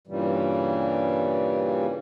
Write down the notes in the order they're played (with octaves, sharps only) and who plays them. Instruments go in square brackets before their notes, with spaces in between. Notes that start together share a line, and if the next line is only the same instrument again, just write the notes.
[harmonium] G2 A#2 C#3 E3 G3